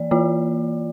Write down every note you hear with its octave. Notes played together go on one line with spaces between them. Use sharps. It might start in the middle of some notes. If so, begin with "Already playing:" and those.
Already playing: E3 A#3 D5
E3 A#3 F4